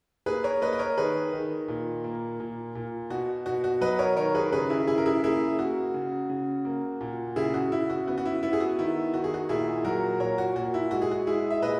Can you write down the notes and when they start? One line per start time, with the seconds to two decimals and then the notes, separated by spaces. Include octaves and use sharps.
0.26 A#3 G#4 B4
0.44 A#4 C#5
0.62 A#3 B4 D#5
0.73 D#5
0.79 A#4 C#5
0.97 D#3 G#4 B4
1.33 D#3
1.68 A#2
2.04 A#3
2.40 A#2
2.75 A#2
3.10 B2 F#4
3.46 B2 F#4
3.64 F#4
3.81 F#3 B4 D#5
3.99 A#4 C#5
4.17 D#3 A#4 C#5
4.35 G#4 B4
4.52 C#3 G#4 B4
4.70 E4 G#4
4.87 C#3 E4 G#4
4.98 A#4
5.06 E4 G#4
5.23 A#3 E4 G#4
5.59 A#3 F#4
5.94 C#3
6.29 C#3
6.65 A#3
7.01 A#2
7.36 C#3 E4 G#4
7.54 F#4
7.72 C#3 E4
7.90 F#4
8.07 B3 F#4
8.18 F#4
8.25 E4
8.43 B3 E4
8.53 G#4
8.60 F#4
8.79 D#3 E4
9.14 D#3 F#4
9.24 G#4
9.34 F#4
9.49 A#2 E4 G#4
9.85 F#3 F#4 A#4
10.20 A#2 A#4 C#5
10.38 F#4
10.56 A#2 F#4
10.74 E4
10.91 G#3 F#4
11.02 G#4
11.11 F#4
11.27 G#3 E4 G#4
11.50 E5
11.62 A#2 B4 D#5